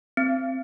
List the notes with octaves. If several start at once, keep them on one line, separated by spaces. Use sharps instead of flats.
C4